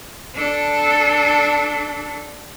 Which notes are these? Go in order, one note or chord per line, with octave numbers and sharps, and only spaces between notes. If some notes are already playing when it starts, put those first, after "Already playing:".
D4 A4